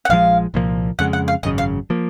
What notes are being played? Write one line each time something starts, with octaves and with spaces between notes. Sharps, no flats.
F#5
A#1 G#2 F3 G#3 F5
C2 A#2 F3 A#3
F2 C#3 G#3 F#5
F#5
F5
G#1 F#2 C#3 D#5
F5
F3 A#3